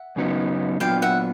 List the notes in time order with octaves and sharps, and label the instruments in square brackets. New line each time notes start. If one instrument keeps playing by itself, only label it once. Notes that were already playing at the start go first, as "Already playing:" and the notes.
Already playing: [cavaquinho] E5 F#5
[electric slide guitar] F#2 C#3 F#3 B3 D#4
[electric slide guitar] A#2 F#3 B3 D4 F4 [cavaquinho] F5 G5
[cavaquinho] E5 F#5